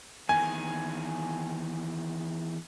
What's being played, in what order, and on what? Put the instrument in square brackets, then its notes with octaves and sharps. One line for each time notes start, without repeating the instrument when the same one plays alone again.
[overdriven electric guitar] E2 D#3 [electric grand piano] G#5